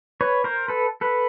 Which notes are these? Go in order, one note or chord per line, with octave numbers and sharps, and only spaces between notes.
B4 C#5
A#4 C5
A4 B4
A4 B4